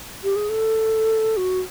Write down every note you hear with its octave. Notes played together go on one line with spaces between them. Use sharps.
G4
G#4
A4
F#4